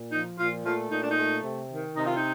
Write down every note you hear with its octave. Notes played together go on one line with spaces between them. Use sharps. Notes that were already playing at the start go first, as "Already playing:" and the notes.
Already playing: A#2
F3 D#4
A#2 F4
A3 F4
A#2 D#4
D4
D#4
A3
C3
D#3
C3 D#4
F4
D#4